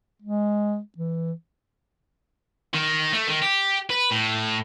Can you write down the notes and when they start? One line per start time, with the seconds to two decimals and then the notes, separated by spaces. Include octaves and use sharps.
0.22 G#3
0.98 E3
2.74 D#3
3.13 A3
3.28 D#3
3.42 G4
3.90 B4
4.11 A2